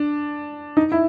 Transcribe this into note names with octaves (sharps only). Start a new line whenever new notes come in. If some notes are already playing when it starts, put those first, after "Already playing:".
Already playing: D4
D#4
E4